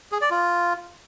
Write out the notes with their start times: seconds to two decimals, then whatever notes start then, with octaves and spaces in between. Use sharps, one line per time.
0.12 G#4
0.21 D5
0.30 F4